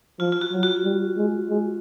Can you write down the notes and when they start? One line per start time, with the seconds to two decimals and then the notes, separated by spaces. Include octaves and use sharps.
0.19 F3 F4
0.32 F4
0.41 F#4
0.52 F#3
0.63 F#4
0.84 G3
1.17 G#3
1.49 G#3